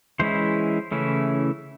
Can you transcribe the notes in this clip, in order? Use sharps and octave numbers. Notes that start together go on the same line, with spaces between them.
E3 G#3 C#4 E4 C5
C#3 E3 A3 C#4 E4